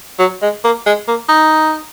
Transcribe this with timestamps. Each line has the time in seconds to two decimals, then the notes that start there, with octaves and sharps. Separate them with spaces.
0.19 F#3
0.42 G#3
0.64 A#3
0.86 G#3
1.08 A#3
1.29 D#4